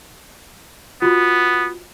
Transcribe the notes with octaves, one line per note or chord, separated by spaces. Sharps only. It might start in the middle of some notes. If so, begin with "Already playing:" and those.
B3 F4 F#4